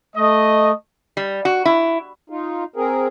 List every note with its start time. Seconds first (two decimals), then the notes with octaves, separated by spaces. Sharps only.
0.16 A3 D#5
1.17 G3
1.45 F#4
1.65 E4
2.30 D#4 F4
2.76 C4 G#4 A#4